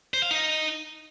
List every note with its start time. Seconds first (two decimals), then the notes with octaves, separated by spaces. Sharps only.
0.14 C5
0.22 F5
0.31 D#4